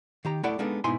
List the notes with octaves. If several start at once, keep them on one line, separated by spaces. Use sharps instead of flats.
D#3 G4 A#5
A3 E4 G4 A4 D5 F#5
G#3 A#3 B3 D4 D#4 A4
G#2 B2 D#4 E4 G#5 C6